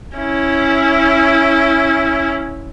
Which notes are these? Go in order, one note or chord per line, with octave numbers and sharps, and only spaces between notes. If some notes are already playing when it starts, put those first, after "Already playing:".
C#4 E4